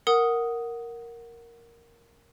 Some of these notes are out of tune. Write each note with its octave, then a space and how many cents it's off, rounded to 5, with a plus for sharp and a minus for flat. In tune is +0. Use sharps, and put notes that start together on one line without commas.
A#4 +0 F#5 +0 D#6 +0